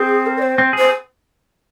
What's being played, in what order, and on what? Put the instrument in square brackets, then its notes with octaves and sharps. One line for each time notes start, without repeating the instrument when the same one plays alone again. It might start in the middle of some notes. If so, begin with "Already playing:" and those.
Already playing: [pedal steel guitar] C4 [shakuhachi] G#4
[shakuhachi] A#4
D5
C5
[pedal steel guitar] C4
[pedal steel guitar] G#4 [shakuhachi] C5